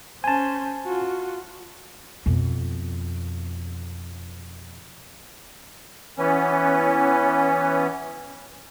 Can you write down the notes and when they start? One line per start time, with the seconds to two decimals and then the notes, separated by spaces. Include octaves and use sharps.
0.24 C#4 C5 G#5 A5
0.86 F4 F#4
2.26 F2 B2
6.18 E3 B3 C#4